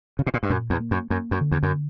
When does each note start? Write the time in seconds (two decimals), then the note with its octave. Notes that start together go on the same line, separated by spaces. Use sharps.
0.19 C#3
0.26 B2
0.34 A#2
0.43 G2
0.50 F#2 A#2
0.70 E2
0.80 A#3
0.91 F#2
1.10 F#2 A#3
1.31 F#2
1.41 D3
1.52 E2
1.63 F#2